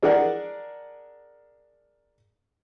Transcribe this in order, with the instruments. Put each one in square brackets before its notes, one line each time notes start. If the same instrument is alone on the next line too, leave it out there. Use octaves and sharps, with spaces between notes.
[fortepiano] D4 G#4 A#4 D5 F#5